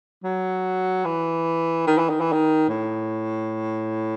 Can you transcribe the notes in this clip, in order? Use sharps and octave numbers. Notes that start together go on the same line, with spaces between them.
F#3
E3
D#3
E3
D#3
E3
D#3
A2